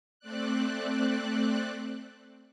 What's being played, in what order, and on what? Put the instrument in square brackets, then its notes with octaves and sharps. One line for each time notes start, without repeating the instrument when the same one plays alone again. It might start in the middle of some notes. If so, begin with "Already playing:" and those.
[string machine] A3 C4 D5 F#6